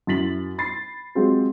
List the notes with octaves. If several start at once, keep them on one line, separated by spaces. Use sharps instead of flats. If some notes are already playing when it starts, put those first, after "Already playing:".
F#2 E4 A6 B6 F#7
B5 A6 C7
F#3 G#3 C4 F4 G4